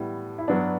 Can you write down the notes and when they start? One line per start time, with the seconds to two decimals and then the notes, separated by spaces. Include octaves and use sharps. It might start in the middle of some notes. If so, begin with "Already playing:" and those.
Already playing: A2 G3 B3
0.38 E4
0.48 G2 F#3 B3 D4